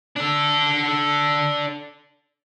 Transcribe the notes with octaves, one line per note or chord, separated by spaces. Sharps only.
D4 A4